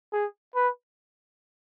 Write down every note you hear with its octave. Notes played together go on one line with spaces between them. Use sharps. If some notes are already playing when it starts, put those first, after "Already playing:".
G#4
B4